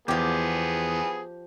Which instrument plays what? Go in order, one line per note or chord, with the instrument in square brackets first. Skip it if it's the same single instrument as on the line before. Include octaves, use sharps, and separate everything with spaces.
[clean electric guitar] E2 [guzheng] F3 G4 [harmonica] B3 G#4